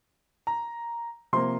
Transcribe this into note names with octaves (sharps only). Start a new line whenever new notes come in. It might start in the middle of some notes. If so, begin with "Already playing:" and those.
A#5
C3 F3 A#3 C6